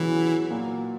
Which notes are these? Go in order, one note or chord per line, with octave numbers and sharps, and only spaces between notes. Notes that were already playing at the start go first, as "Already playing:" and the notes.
Already playing: B2 E3 F#3 C#4 G#4
A#2 F#3 A#3